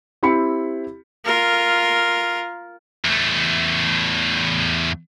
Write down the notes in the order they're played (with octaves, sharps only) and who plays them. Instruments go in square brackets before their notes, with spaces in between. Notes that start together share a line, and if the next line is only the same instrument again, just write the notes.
[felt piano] C4 E4 G4 B5 C#7
[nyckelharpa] F4 A#4
[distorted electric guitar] E2 A3